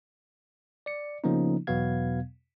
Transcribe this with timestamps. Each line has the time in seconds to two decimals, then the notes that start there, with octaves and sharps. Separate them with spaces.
0.86 D5 C#7
1.24 C#3 F3 A#3 B3 C#4 D#4
1.67 E2 B2 F#3 B3 F5 G#6